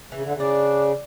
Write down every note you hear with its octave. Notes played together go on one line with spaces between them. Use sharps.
C#3 E3
D3
C#3
D4